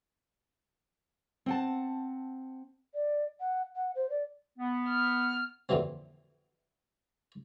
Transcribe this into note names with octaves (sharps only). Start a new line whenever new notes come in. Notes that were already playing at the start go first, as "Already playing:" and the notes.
C4 F#5 A5
D5
F#5
F#5
C5
D5
B3
F6
F2 A#2 D3 E3 F#3 C4